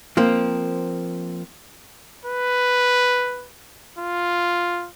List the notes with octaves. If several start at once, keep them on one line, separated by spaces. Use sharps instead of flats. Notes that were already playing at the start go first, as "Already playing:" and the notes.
F3 A#3 C4
B4
F4